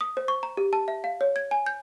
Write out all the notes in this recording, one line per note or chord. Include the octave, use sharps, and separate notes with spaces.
D#6
C5
C#6
A#5
G4
A5
E5
F5
C#5
G#6
G#5
G6